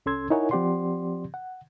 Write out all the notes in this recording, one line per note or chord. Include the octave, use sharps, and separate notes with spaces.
C2 C#4 A4 C6 E6 G#6
D#4 E4 A#4 C#5 F#5 G#5
F3 C4 G4 D5 F#5 C6
F#5